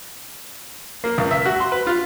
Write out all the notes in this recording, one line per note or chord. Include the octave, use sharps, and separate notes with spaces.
A#3
C#2
E5
F#4
C6
B4
F4